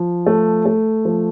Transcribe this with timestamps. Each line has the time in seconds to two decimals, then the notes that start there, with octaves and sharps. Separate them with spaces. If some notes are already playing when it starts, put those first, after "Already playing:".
Already playing: F3
0.26 A3
0.65 A3
1.05 F3